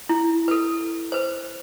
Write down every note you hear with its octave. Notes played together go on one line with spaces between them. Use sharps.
E4
A4 B4
B4 C5